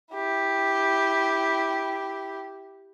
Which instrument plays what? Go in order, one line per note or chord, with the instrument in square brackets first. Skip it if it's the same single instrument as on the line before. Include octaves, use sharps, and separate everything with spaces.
[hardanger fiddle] E4 G4